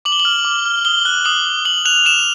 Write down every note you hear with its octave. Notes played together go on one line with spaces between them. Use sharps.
D6 F#7
G7
F#7
F6
D6
F6
D#6 G7
F#6
D#6 F#7
F#6
D#6 F#7
F#6 F7
D#6 E7